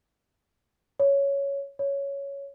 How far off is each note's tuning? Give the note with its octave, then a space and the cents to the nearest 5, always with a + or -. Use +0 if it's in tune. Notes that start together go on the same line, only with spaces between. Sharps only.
C#5 +5
C#5 +5